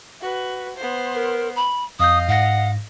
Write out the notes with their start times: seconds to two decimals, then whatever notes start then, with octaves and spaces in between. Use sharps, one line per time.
0.21 F#4 B4
0.76 B3 C5
1.15 A#4
1.56 B5
2.00 F2 D#5 F5 D#6 G6
2.28 G#2 F#5 A#6